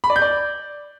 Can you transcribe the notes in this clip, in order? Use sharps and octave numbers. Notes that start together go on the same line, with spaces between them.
B5
D5
G6
D5